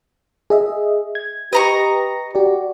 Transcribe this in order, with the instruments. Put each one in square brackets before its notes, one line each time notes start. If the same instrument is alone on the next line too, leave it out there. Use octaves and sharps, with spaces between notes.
[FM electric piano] G#4 D#5 E5
G#6
[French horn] G4 [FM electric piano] B4 A#6 [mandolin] D#5 A#5 C#6
[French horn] F#4 [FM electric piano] G4 D5